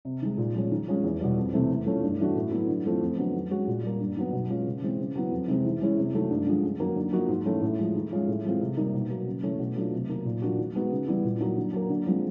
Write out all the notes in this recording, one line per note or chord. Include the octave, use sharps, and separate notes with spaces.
C3
D#3 G#3
A#2
F3 G#3 C#4
D#3
G#3 C#4 F4
E2
B2 G3
F2
C3 E3 A3 C4
E3
A3 C#4 F4
G2
E3 A3 D4 F#4
A2
F#3 B3 E4
D3
F3 A3 C4 F4
F2
D3 F#3 B3
D#3
G#3 C#4 F#4
A#2
G3 A#3
G2
D#3 F#3 B3
B2
G#3 C#4 F4
C#3
E3 G#3 C4
C#3
F#3 B3 E4
F2
C3 D#3 G#3 C4
E3
G#3 C#4 E4
C3
D#3 F#3 A3
G2
D3 F3 G#3
F#2
D#3 F#3 A#3
D3
F3 A#3 D#4 F#4
G#2
E3 A3 C#4
A2
F3 G#3
D#3
G#3 C#4 F4
A2
E3 G#3 C4 F4
C3
D#3 G3 A#3 D#4
B2
F#3 A#3
C#3
E3 A3 C#4
B2
F#3 A3 D4 F4
C3
D#3 F#3 A#3
A#2
F3 A#3 D4 F#4
D#3
G#3 B3 D#4 F#4
C#3
E3 G3 B3 E4
A#2
F#3 A#3 D#4
D3
F#3 A#3
D3
F3 G#3 C4